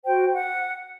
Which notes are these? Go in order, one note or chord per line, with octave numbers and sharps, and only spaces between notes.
F#4 C5 G5
F#5